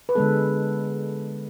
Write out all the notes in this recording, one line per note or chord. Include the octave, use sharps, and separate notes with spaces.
B4
D3 G#3 B3 A4